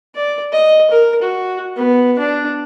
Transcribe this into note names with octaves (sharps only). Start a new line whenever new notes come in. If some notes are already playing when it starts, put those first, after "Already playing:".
D5
D#5
A#4
F#4
B3
D4